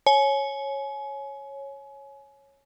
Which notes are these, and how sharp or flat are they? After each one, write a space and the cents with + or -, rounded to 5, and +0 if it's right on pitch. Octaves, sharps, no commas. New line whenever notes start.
C#5 -10 G#5 +30